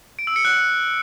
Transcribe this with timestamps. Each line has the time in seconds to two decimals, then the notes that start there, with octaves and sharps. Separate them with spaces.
0.19 D7
0.27 E6
0.36 C#7
0.45 F#6